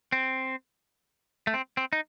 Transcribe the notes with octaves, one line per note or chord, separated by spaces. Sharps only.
C4
A3
C4
C4
D#4